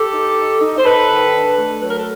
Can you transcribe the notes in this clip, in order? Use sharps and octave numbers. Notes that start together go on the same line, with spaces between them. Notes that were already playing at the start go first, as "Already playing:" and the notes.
Already playing: G4 A4
D#4
D#4
D#4
C5
D#4 A4 B4
D#3
D4
A3
F#3 B4
A#4
A4